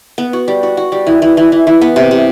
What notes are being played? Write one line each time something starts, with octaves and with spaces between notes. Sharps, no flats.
B3
F#4
G3
F#4
F#4
G3
E3
E3
E3
E3
E3
B3
C3
C3